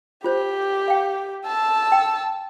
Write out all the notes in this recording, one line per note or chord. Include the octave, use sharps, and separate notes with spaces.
F4 G4 C5 C#5
F5 G5
A5 E6
G5